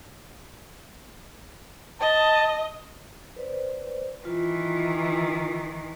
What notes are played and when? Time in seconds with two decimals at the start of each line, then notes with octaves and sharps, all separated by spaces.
2.01 D#5 A5
3.36 B4 C5 D5
4.25 D#3 E3 F4